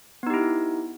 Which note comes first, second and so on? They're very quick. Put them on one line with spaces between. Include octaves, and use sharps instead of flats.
B3 D#4 G4 E4